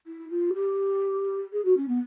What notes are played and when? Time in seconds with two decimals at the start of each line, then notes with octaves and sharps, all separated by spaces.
0.07 E4
0.30 F4
0.54 G4
1.52 G#4
1.65 F#4
1.77 C#4
1.88 B3